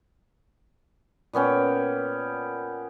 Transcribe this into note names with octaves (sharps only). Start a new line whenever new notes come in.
A#2 B3 C#4 G5